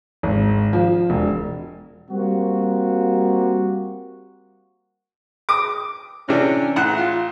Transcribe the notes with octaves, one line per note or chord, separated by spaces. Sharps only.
G#1
F3
E1
G3 A#3 C4 F#4
D6 D#6
C3 E3 C#4 D4
A1 F#5
F4